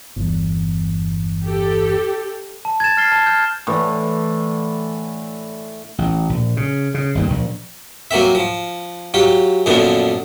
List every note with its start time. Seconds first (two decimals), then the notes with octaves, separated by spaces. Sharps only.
0.16 G1 E2
1.46 G4 A4
2.65 A5
2.80 G#6 A6 E7
2.97 F6 A6 C7 G7
3.12 A5
3.26 F6 G6
3.67 A2 D3 E3
5.98 A1
6.29 A#1
6.57 C#3
6.94 C#3
7.15 G1 D#2 A#2
7.30 A#1
8.11 F#3 A#3 C4 E5
8.35 F3
9.14 F#3 F4 G4
9.66 F#2 A#2 D3 F3 B3 D4